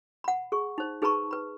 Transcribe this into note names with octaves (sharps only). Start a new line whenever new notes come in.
F#5 B5
G#4 C#6
D#4 C5
D#4 G#4 B4 A5 B5 C#6
B4 B5